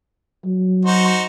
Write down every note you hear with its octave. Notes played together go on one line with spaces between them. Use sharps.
F#3
D#4 F#4 C5